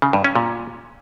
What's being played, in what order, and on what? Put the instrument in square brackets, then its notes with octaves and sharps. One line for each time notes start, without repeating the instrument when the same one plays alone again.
[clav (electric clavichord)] C#3
G2
C#4
A#2